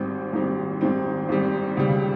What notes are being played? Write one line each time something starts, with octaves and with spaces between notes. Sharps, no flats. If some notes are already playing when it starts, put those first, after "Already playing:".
Already playing: G#1 G#2 D#3 G3 C4
G#1 G#2 D#3 G3 C4
G#1 G#2 D#3 G3 C4
G#1 G#2 D#3 G3 C4
C#2 C#3 G3